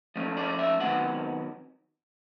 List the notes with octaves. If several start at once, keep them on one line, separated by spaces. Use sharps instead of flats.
F3 A3 C#4
D5
E5
C3 D#3 F#3 B3 F#5